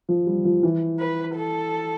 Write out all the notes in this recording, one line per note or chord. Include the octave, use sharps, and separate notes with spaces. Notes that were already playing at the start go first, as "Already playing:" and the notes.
F3
G3
F3
E3
B4
A4